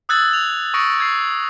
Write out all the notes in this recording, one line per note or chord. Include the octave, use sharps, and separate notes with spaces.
D#6 E6 F#6 G#6 A6 F#7
F7
C#6 D#6 A#6 C#7 D7
C#6 G#6 C7